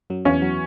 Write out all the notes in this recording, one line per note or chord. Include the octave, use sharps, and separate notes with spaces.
F#2 F#3
E2 E3 C#4
F#3